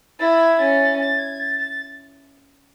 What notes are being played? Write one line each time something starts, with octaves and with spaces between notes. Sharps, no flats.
E4 G#6 A6
C#4 A6
A6
G#6
A6
A6